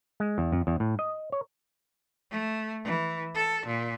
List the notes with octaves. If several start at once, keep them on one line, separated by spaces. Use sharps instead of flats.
G#3
E2
F2
E2
A2
D#5
C#5
A3
E3
A4
A#2